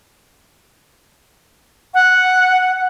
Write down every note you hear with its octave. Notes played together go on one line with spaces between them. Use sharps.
F#5